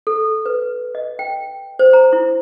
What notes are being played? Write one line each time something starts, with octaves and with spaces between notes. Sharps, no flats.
A4
B4
D#5
G5
C5
A#5
E4